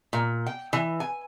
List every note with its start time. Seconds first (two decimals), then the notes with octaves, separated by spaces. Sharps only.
0.13 A#2
0.46 G5
0.73 E3
1.00 G#5